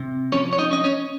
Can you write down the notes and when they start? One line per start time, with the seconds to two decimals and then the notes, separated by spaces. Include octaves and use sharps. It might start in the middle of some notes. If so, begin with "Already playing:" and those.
Already playing: C3
0.32 F3 C#4 C#5
0.53 C#5
0.58 D#4 D#5
0.71 C#4 D#5
0.84 C#4 C#5